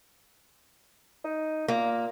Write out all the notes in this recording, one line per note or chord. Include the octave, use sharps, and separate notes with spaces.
D#4
A#2 A#3